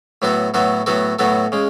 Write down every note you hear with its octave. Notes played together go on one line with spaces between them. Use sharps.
A2 F#3 B3 F#4 A4
A2 F#3 B3 F#4 A4
A2 F#3 B3 F#4 A4
A2 F#3 B3 F#4 A4
C#3 G#3